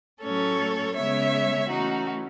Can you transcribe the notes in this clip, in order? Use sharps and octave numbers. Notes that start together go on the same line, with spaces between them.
A2 F#3 A3 C#4 A4 C#5
C#3 G#3 B3 C#5 E5
E3 A3 C#4 D#4 F#4